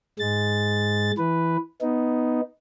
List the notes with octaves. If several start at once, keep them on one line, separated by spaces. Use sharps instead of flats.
G#2 G#3 A6
E3 B4
B3 D#4